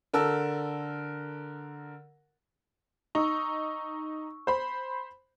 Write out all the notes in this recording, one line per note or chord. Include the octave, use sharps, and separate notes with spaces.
D3 A#4 A5 E6
D#4 C#6 E6
C5 B5